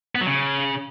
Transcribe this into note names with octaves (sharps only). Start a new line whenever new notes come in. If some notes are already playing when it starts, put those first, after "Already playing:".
B3
F#3
C#3